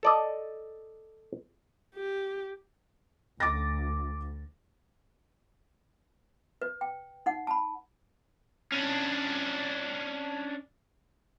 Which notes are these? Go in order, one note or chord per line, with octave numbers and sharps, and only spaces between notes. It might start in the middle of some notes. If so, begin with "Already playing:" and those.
A4 D5 D#5
G4
D2 D6 A6 A#6
B4
G5
D#4 F#5
A5 B5
C#4 D4